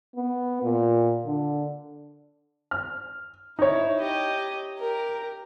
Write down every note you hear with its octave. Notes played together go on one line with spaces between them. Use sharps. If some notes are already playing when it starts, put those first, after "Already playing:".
B3
A#2
D3
F6
D#4 E4 C#5
G4 D#5
G4 A#4